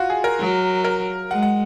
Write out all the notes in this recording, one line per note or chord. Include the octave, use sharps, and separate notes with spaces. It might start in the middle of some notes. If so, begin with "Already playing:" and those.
Already playing: F4 F#4
G#4
A#4
F#3
A#4
G#3 F#5
F#5